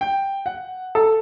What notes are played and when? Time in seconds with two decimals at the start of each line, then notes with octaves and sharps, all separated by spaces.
0.01 G5
0.46 F#5
0.95 A4